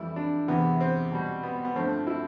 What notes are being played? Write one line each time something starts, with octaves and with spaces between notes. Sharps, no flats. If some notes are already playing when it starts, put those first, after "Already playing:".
Already playing: F2 E3 G3 E4
D4
E2 C3 E3 B3
C4
B2 G3
B3
B3
G2 F3 A3 C4
E4